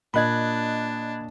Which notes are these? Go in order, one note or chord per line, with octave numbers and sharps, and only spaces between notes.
A#2 D4 D#5 B5 F#6 G#6